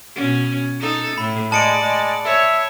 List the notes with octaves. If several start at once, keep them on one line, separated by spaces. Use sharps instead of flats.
B2 C#4
D#4 A4
A2 B5
G#3 D5 A5 C#7 D7
G#3
C#5 E5